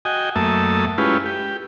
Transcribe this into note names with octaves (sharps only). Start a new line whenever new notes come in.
F#4 D#5 G5 G#5
F#2 A3 A#3 E5 A5 D#6
G#3 C#4 E4 F4 G4 B4
G4